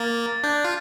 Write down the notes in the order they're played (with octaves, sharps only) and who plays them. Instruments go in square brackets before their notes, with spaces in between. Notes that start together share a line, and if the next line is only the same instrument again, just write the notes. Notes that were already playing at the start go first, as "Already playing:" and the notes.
Already playing: [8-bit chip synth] A#3 [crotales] A6
[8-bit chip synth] D4 [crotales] G6
[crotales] G6
[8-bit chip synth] F4